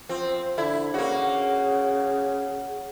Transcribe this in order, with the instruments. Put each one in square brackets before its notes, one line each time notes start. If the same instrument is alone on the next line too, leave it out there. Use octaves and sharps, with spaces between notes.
[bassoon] F3 [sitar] C4
[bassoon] D3 [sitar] E4
[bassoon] C#3 [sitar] A#3 F#4